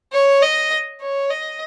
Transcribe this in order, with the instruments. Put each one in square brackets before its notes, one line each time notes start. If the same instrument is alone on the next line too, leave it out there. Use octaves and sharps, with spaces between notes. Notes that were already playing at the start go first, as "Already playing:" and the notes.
[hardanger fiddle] C#5
D#5
C#5
D#5